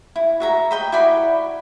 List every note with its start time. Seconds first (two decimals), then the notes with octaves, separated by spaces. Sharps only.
0.16 E4
0.40 F#4 E5 A#5
0.71 D#5 G5 B5
0.92 E4 F#4 D5 B5